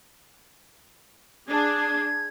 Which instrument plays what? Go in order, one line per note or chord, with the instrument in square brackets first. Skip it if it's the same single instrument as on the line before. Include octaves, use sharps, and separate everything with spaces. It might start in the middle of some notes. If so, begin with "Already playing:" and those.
[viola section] D4 G#4 [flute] G#6